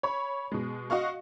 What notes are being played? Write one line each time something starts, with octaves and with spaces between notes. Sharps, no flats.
C#5 B5
B2 G#3
F#4 D#5 F5 C#6